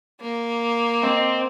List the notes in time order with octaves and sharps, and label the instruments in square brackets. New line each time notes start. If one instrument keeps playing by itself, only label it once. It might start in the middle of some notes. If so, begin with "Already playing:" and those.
[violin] A#3
[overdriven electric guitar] C4 [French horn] D#5